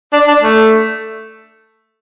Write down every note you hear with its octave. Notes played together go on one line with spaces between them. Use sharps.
D4
D4
A3